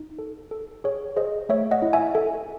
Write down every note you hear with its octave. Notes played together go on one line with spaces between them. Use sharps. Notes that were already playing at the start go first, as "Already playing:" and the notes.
Already playing: D#4
A4
A4
G#4 C#5
G#4 C5 D#5
A3 C#5 E5
D#5 F#5
E4
E5 G#5
A4